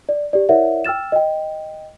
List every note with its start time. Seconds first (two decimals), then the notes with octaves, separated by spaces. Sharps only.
0.09 D5
0.33 G4 D5
0.49 E4 A#4 C#5 D5 E5 F#5
0.84 G5 E6 F6 A6 E7
1.12 D#5 G5